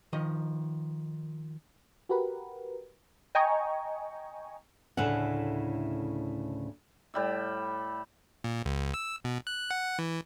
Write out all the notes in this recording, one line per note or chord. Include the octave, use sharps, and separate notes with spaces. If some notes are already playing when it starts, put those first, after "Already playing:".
D#3 F3 D#5
F#4 G4 A#4 B4
D#5 G5 G#5 A#5 C#6
D2 A2 C#3 E4 F#5
A2 G3 E5
A#2
C#2
E6
B2
F#6
F#5
E3